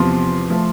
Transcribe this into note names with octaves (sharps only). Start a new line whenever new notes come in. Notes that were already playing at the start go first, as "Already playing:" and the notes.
Already playing: E2 C3 F3 C6
F3 A3